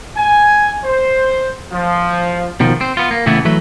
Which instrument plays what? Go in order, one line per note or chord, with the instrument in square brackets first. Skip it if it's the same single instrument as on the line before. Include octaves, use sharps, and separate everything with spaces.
[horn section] G#5
C5
F3
[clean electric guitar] B2 D#3 F3
C4
B3 F4
A#3
A2 C#3 E3 A3 B3 E4
E3 F#3 A3 B4